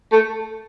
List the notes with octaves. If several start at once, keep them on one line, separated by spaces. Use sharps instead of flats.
A3